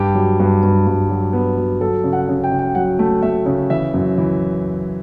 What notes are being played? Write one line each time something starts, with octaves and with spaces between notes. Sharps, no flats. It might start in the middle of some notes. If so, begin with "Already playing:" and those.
Already playing: G2 G4
F#3
G2
G2
G2
F#3
B3
F#3
F#3 A4
C#3
F#5
C#3
G5
C#3
G5
F#3 F#5
A3
A3 E5
C#3
E3 E5
F#2
E3